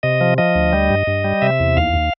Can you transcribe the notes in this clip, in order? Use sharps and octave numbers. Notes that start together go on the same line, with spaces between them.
C3 D#5
F3
F3 D#5
D2
G3
G2
G2
G3
C3 E5
E2
D#2 F5
D#2